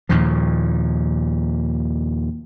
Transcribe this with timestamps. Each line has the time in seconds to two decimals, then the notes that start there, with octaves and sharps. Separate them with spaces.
0.09 D#2 A#2 F3